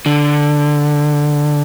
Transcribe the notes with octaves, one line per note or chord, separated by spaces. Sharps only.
D3